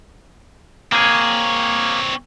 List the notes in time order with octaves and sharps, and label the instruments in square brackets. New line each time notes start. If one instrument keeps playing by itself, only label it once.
[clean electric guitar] A#3 G#4 [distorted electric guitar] C4 C#5